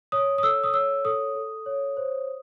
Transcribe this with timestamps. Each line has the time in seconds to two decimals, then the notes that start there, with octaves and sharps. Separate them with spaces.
0.12 C#5 D#6
0.38 D#6
0.43 A4 E6
0.64 D#6
0.74 C#5 E6
1.05 A4 D#6
1.35 A4
1.66 C#5
1.97 C5